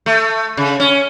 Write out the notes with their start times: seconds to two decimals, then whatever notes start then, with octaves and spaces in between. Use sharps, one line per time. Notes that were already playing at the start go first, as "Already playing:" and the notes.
0.06 A3
0.57 C#3
0.80 C#4